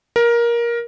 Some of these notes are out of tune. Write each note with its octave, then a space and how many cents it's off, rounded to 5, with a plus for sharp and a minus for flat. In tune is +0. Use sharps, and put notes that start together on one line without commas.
A#4 +15